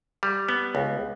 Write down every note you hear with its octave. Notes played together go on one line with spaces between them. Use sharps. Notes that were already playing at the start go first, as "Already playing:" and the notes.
G3
B3
C#2